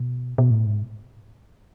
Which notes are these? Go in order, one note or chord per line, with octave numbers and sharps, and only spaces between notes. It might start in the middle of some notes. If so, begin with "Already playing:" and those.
Already playing: B2
B2
A2
G#2